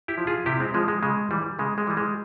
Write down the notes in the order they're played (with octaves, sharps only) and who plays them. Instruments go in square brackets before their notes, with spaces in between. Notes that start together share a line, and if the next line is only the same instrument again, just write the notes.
[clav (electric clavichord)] E4 G4
F3
F4 G#4
C3 E4 G4
G#3 C4
F3 G#3
G#3
C#3 G#3
E3 G3
C#3 G#3
G#3
E3 G3
G#3